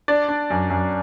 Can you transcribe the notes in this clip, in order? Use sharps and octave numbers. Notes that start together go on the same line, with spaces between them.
D4 D5
D4
F#2
F#2